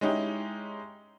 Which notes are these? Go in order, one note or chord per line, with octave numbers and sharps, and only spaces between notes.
G#3 C#4 D#4 E4 G4